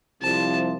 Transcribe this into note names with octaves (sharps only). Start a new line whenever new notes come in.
C2 C3 F3 A5